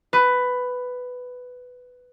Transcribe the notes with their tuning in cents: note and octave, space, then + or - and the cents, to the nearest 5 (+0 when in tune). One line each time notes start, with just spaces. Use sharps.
B4 +10